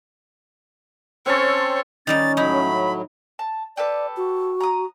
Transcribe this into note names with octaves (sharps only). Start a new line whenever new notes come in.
C4 C#4 A4 C5 C#5
D#3 G3 C#4 D#4 A6
A2 F#3 D#4 E4 B5
A5
G4 A4 B4 D5
F#4
A#5 D#6